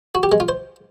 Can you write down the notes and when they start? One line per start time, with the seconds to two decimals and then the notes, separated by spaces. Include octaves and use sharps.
0.15 F#4
0.23 G4
0.32 G#3
0.40 F4
0.49 C5